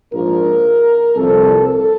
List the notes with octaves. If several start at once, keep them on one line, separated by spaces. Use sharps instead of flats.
A#1 G#2 F3 A#4
C2 A#2 F3 A4
A4